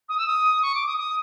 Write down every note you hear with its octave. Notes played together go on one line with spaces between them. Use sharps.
D#6
E6
D#6
C#6
D6
D#6
D#6